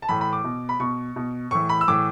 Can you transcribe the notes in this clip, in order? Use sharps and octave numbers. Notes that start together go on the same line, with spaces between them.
A5
A2 E3 B5
B5
D6
B2
B5
B2 C#6
B2
A2 E3 C#6
B5
E6
A2 E3 D6